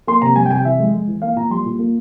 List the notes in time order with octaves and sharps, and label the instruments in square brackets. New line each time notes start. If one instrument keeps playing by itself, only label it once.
[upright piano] A#3 C6
C3 A#5
G3 G#5
G5
C3 G#5
G5
E3 E5
G#3
G#3
E3
A#3 F5
A#2 A#5
G3 C6
A#2
A#3